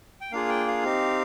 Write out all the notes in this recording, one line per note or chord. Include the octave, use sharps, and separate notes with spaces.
G5
A#3 D4 F4 G#4 F5
G5
F5
C4 D#4 G4